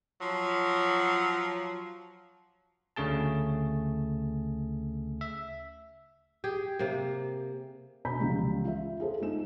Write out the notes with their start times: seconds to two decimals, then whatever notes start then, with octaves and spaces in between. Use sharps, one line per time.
0.21 F3 F#3
2.96 D2 C#3 A3 G#4 A5
5.21 E5
6.44 G4 G#4
6.79 C3 A#3
8.05 B2 B3 A#5 B5 G6 B6
8.20 C#2 E3 F3 G3 G#3
8.65 F4 E5
9.00 F4 G#4 A4 C5
9.21 G#3 D#4 E7